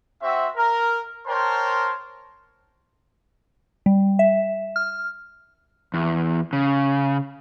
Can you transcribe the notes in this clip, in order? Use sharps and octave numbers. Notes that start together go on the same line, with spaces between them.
C4 F#4 E5
A#4
A#4 C5 C#5 G5 A5 C6
G3
E5
F6
E2
C#3